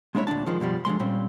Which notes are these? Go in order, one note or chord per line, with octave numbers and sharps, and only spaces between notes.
G#3 A#3 D4 E4 C#5 E5
D2 A#2 F#3 D4 A5
D#3 F3 G#3
F#2 B2 F3 G3
D3 F3 G#3 C6
A#2 G3 C4 C#4